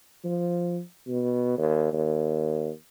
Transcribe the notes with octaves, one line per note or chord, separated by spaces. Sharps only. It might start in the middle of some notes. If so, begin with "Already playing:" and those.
F3
B2
D#2
D#2